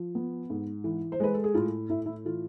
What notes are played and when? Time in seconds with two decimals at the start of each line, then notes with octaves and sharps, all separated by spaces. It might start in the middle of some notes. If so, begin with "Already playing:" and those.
Already playing: F3
0.15 B3
0.50 G#2
0.84 E3
1.12 C5
1.20 G#3 B4
1.34 A4
1.44 G#4
1.54 A2 F4
1.90 A2 E4
2.06 E4
2.25 E3 F4